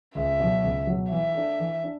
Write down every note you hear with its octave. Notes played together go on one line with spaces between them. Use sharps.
C#2 E5
B2 F#3
C#2
B2 F#3
E3 E5
A3 D4
E3
D4